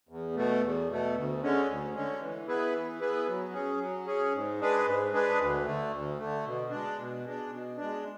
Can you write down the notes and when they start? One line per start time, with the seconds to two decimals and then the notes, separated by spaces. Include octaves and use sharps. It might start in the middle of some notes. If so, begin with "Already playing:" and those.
0.09 E2
0.35 B2 A3
0.61 E2
0.89 B2 A3
1.15 D2
1.41 D3 G#3 C#4
1.67 D2
1.95 D3 G#3 C#4
2.20 E3
2.47 B3 E4 G#4 B4
2.73 E3
3.00 B3 E4 G#4 B4
3.27 F#3
3.53 C#4 G#4
3.80 F#3
4.07 C#4 G#4
4.33 G#2
4.59 G#3 D4 G#4 B4
4.86 G#2
5.12 G#3 D4 G#4 B4
5.39 D2
5.65 D3 A3
5.91 D2
6.18 D3 A3
6.45 B2
6.71 G#3 D4
6.98 B2
7.24 G#3 D4
7.50 B2
7.77 G#3 D4